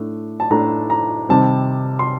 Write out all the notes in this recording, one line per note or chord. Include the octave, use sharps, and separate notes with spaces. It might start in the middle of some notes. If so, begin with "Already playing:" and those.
Already playing: A2 A3 D4
A5
A2 A3 D4 A#5
A#5
C3 D#3 G3 C4 A5
C6